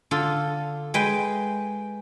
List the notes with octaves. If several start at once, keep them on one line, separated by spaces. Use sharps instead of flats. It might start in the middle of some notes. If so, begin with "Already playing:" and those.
D3 F4 A4
G#3 B4 G5